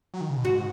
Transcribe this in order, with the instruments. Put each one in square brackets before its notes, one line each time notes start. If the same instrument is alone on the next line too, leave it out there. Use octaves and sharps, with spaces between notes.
[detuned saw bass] F#3
D#3
C#3
B2
[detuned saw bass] G#2 [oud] F#4